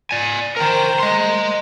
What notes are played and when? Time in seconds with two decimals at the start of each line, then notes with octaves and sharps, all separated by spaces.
0.11 D5 G#5
0.56 A#4 C5 G5 A#5
1.00 D#5 C6